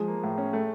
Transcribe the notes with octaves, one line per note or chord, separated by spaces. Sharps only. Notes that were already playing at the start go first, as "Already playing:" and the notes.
Already playing: F3 G#3 G#4
A#3
A2
C#4
A3